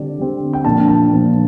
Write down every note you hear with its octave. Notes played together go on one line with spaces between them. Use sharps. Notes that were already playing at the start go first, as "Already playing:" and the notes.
Already playing: D3 G3 C4 D5
D3 G3 C4
G5
A#2 F3 A#3 D4 A5
A5
A#2 F3 A#3 D4